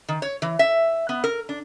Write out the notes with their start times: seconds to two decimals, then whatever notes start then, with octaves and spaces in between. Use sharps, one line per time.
0.09 D#3
0.22 C#5
0.42 E3
0.59 E5
1.09 B3
1.24 A#4
1.49 D4